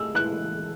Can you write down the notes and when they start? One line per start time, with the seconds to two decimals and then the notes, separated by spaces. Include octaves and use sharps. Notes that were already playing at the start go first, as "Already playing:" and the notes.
Already playing: G#3 A3 E6
0.15 E3 F#6